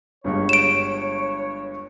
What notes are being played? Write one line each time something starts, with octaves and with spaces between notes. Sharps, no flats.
G1 G2 G#3 C#5
D7 E7